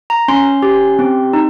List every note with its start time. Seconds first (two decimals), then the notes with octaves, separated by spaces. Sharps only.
0.10 A#5
0.28 C#4 C6
0.63 G4
0.99 C4
1.33 D#4